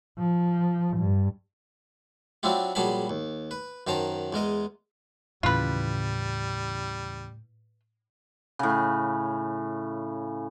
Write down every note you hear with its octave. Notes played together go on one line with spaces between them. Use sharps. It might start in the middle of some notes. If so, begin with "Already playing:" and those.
F3
G2
F#3 C4 D4 E4 F4 G4
A#1 F#3 G3 G#4 A5 B5
D#2
B4
F#2 D#3 C5 A5 A#5
E2 G#3 A#4 D#5
D#2 A2 C#3 E3 G3 F4 B4
A2 C#3